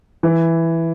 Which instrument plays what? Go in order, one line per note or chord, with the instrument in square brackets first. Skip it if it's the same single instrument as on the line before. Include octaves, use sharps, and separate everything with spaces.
[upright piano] E3